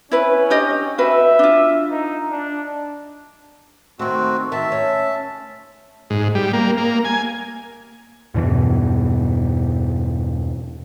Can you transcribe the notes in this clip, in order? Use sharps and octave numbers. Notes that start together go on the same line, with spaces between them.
C#4 E4 B4
D4 G4 D#5
F#4 B4 E5
D4 F4
D#4
D4
D#3 A3 C4 F#4
D#3 E5 A5
C#4
G#2
G3
A#3
A#3
G#5
E2 G2 B2 E3